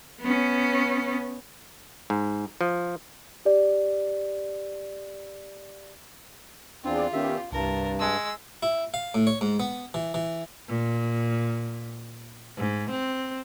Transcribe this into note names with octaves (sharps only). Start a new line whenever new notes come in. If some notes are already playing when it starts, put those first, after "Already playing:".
B3 C#4
G#2
F3
G4 D5
E2 C4 D4 F4 G#4 D5
D#3 B3 C#4 G4 E5
C2 G2 A#4 A5
G#3 E6
E4
F5
A2
C#5
G#2
B3
E3
E3
A#2
G#2
C4